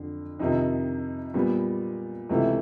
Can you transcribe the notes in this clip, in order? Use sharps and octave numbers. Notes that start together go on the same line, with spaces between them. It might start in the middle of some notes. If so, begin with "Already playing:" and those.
Already playing: F2 D3
F2 C3 D#3 D#4
A#2 G3 B3
C#2 C3 E3 A3